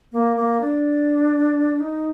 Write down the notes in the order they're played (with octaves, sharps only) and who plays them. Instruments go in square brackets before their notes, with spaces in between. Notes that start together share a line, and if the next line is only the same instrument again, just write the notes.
[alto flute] A#3
A#3
D4
D#4